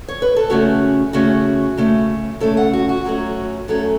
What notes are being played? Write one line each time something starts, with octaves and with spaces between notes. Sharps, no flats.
C#5
B4
A4
C#3 A3 C#4 F#4
C#3 A3 C#4 F#4
C#3 A3 C#4
C#3 A3 C#4 A4
F#5
F#4
F#4
F#2 F#3 A3 C#4
F#2 F#3 A3 C#4 A4